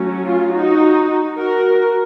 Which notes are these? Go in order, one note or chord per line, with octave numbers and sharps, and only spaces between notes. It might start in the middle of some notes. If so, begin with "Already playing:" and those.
Already playing: F#3 A3 C#4
F4
D#4 F#4
F#4 A#4